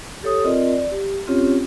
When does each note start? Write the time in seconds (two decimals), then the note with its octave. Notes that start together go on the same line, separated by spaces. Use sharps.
0.23 G4 A4 C#5 D#6
0.44 C4 F4 A#4 D5 D#5
0.71 D5
0.91 G4
1.27 C4 C#4 F4 G4 C#5